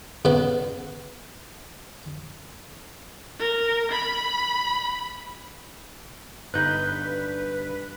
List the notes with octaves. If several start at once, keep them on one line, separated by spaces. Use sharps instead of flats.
C#3 B3
A#4
B5
G1 G2 D#4 B4 F#6 G6